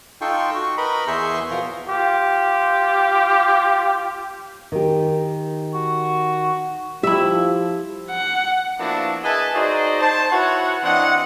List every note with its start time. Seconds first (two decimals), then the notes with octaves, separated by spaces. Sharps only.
0.21 D#4 F4 A4 G5 C6 C#6
0.55 F#4 C#6
0.78 A#4 B4 D#5 A#5 B5
1.07 E2 G#4 E5 C6 C#6 G6
1.51 B2 F3 F4 A#4 A#5
1.88 F4 G4
4.72 D#3 G4
5.74 F#4
7.03 F3 E4 G4 E5
8.10 F#5
8.80 F3 A#3 B3 D4 E4 F#4
9.24 G#4 B4 D#5 E5 G#5 A5
9.54 D#4 F#4 G#4 C5 D5 D#5
10.01 C5 A5
10.32 E4 F#4 B4 C#5 F#5
10.84 E3 C4 D4 D#5 F#5